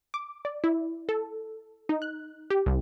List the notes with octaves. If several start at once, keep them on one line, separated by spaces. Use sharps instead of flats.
D6
D5
E4
A4
D#4
F#6
G4
C2